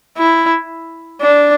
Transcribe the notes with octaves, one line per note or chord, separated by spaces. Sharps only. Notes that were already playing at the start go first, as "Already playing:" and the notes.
E4
D4